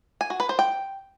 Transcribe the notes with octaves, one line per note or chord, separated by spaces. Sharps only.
G#5
F#4
B4
C5
G5